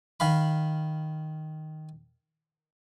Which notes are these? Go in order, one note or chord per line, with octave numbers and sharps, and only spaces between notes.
D#3 F5 B5